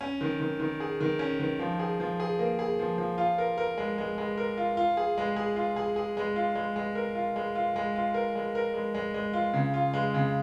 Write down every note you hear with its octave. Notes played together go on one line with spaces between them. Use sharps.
C#4
D#3
D#3
D#3
G#4
D#3
C#4
D#3
F3
G#4
F3
G#4
A#3
G#4
F3
F3
F4
A#4
A#4
G#3
G#3
G#3
A#4
F4
F4
G#4
G#3
G#4
F4
G#4
G#4
G#3
F4
G#3
G#3
A#4
F4
G#3
F4
G#3
F4
A#4
G#3
A#4
G#3
G#3
G#3
F4
C#3
F4
G#3
C#3